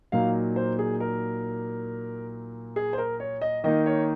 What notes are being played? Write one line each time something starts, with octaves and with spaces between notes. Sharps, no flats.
A#2 F#3 A#3 D#4 F5
C5
G#4
A#4
G#4
C5
A#4
C#5
D#5
D#3 A#3 D#4 D#5
C#5